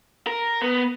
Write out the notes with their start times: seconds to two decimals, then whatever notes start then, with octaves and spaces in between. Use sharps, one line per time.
0.27 A#4
0.62 B3